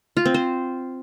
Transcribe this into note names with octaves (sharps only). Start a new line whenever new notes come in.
F4
C4
C5